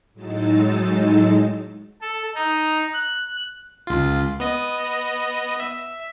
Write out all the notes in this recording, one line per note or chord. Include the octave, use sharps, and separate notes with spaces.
A2 F#3 G#3 D#4 E6 A6
A4
D#4
F#6
C#2 F4
B3 D#5
E5